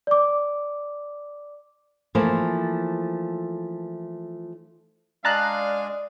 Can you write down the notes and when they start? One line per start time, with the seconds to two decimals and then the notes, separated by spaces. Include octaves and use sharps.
0.07 D5 D6
2.15 E3 F3 A3 A#3 E4 F4
5.25 G#3 D4 G#4 D5 F5 A5 A#5 F#6